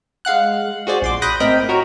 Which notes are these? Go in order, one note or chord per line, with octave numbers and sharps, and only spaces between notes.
G#3 F5 F#5 F#6
F#4 G#4 C5 D5
A#1 C6 D6
B5 D#6 F#6 G6 A#6
A2 C4 A#4 D#5 G5 B5
F#4 A#4 C#5